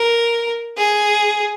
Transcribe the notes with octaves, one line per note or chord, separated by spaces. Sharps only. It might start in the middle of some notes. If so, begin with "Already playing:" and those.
Already playing: A#4
G#4